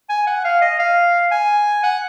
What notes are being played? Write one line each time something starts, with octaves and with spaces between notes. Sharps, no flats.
G#5
F#5
F5
D#5
F5
G#5
F#5